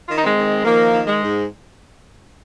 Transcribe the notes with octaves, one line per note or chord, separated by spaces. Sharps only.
D#3 F4
D#4
G#3 C4
D#3
D#3 F3 A#3
D#3
G#3
G#2